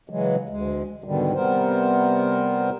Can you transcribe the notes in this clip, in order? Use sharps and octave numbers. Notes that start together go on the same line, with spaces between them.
C#3 E3 F#3 G#3
D2 G#3
G#2 B2 D3 D#3 G3
C3 G3 B3 A#4 C5